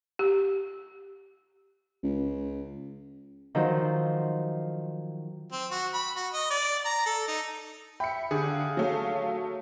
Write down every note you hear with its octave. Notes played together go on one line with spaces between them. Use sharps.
G4
C#2
D#3 F3 F#3 C5
C4
F#4
B5
F#4
D#5
D5
A#5
A4
D#4
E5 G5 B5 C#7
D3 G4 G#4
F5
F#3 A3